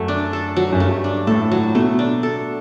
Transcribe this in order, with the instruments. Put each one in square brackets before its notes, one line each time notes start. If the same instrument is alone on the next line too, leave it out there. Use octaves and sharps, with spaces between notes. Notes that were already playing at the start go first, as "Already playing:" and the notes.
Already playing: [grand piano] F#2 [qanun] F#3 A3 A4
[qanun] D4
A4
F#3
[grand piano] F#2
[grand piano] G2 [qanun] A3
[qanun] D4
[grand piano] A2 [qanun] A4
[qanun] F#3
[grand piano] B2 [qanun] A3
[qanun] D4
A4